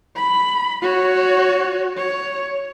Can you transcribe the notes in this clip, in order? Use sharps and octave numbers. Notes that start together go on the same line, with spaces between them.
B5
F#4 C#5
C#5